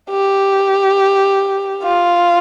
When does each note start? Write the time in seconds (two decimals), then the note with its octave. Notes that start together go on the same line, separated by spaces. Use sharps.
0.10 G4
1.83 F4